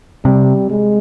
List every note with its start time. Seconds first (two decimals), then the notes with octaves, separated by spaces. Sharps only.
0.25 C3 G3
0.70 G#3